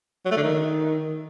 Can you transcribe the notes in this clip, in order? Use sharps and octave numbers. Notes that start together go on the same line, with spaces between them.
F#3
A3
D3
D#3